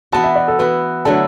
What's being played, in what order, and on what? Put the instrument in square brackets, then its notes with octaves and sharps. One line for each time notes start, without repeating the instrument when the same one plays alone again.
[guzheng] E3 B3 F#4 [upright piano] A5
[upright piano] E5
D5
A4
[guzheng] E3 B3 F#4 [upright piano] B4
[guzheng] D3 F#3 A3 E4 [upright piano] A5